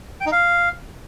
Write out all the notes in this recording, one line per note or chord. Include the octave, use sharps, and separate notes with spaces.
G5
D#4
F5